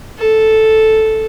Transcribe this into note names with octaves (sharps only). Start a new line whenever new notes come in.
A4